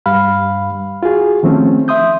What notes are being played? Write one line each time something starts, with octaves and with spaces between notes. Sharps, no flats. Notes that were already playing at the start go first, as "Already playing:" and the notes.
G2 G3 F5 B5 F6
F4 F#4 G#4
D#3 F3 A3 C4 C#4
E5 C6 D#6 G6